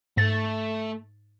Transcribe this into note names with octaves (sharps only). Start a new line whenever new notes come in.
G#2 A3 A6